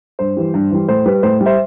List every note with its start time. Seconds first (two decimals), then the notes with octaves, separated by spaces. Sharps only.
0.19 G2 C5
0.37 E3 G3
0.54 G2
0.71 E3 G3
0.88 A2 C5
1.06 G3 B4
1.23 A2 C5
1.40 G3
1.46 C5 E5